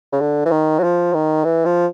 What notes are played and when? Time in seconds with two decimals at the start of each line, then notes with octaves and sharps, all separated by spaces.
0.12 C#3
0.21 D3
0.46 E3
0.52 D#3
0.79 F#3
0.84 F3
1.14 D#3
1.45 E3
1.65 F3